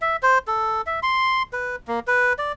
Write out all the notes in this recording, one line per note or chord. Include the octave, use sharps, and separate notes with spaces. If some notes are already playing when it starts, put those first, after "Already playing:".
E5
C5
A4
E5
C6
B4
A#3
B4
D5